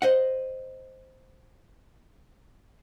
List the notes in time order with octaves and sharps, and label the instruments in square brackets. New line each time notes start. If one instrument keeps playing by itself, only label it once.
[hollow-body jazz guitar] C5 D#5 F#5